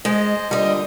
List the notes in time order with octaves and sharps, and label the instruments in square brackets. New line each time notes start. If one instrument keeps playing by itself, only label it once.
[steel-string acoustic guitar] G#3 [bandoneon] C5 D#5
[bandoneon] A#2 D3 [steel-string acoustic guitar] G3 D#5